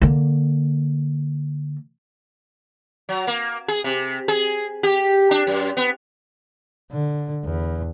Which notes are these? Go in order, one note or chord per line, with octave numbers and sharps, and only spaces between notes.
D3 A#3
F#3
A#3
G#4
C3
G#4
G4
D4
F#2
B3
D3
E2